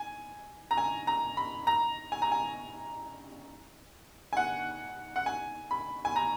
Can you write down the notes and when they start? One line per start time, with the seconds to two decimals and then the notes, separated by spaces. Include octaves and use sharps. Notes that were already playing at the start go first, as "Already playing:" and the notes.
Already playing: G#5
0.71 A#5
0.77 G#5
1.07 A#5
1.37 B5
1.67 A#5
2.12 G#5
2.22 A#5
2.32 G#5
4.33 G#5
4.37 F#5
5.16 F#5
5.26 G#5
5.71 B5
6.05 G#5
6.16 A#5